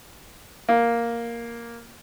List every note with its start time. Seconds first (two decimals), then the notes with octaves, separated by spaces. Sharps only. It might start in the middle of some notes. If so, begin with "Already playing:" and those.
0.69 A#3